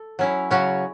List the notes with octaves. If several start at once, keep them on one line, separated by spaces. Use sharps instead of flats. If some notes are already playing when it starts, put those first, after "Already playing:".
Already playing: A4
F#3 C#4 E4
C#3 F#3 C#4 F#4